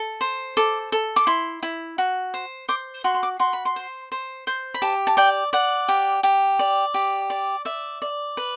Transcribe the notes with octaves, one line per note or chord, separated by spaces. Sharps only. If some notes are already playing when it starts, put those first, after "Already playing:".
Already playing: A4
C5
A4 D6
A4
D6
E4 C6
E4
F#4
C5
C5 D6
F#4 C6
C6
D6
F#4 C6
B5
C6
C5
C5
C5
B5
G4 A5
A5
D5 G5
D5 F#5
G4
G4
D5
G4
D5
D5 E5
D5
B4